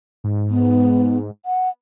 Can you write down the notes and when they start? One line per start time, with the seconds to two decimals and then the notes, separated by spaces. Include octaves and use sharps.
0.24 G#2
0.50 B3
1.46 F#5